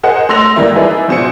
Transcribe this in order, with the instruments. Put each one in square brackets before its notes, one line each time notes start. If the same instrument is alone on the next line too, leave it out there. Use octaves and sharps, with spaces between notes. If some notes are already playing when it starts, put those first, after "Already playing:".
[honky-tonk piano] G#4 A#4 C5 D#5 F#5
A3 C6 E6 A#6 F7
G#1 E3 G3 A#3 E5
D#4 E4 G#4 B4 D5 E5
A#1 B2 C5 G#5 C#7